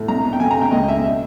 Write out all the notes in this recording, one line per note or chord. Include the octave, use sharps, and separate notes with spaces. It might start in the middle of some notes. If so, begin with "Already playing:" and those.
Already playing: A2
C2 A#5
B2
G5
F2 G#5
A#5
C3
G5
C#2 D#5
B2 E5
E5